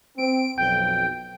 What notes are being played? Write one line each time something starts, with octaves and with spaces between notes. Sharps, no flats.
C4 D7
B1 F2 G5